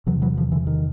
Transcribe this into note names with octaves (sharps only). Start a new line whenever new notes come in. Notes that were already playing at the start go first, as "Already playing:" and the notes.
E2 C3 E3 F#3
E3 F#3
D#3 F3
D3 E3
D#3